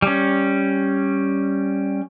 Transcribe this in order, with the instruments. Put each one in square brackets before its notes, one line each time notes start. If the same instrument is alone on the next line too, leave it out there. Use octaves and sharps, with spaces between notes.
[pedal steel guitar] G3 C#4